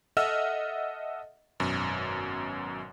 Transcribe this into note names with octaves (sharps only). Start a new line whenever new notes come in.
A4 D#5 E5 F#5 E6 F6
G#1 F#2 B2